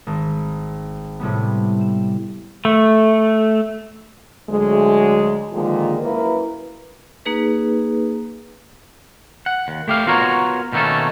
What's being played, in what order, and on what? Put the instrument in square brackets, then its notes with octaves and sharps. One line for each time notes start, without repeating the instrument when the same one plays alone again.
[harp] G#1
A2 C3 G3 B3
E7
[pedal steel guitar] A3
[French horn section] D2 F#3 G#3
A#2 D3 D#3 F3 G#3 A#3
F#2 A#3 E4 B4
[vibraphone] A#3 D#4 G#4 B4
[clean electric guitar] F#5
D#2
A3 G4 F5
B3 F4 F#4 A#4 C#5
B2 D#3 A3 A#3 C#4 A4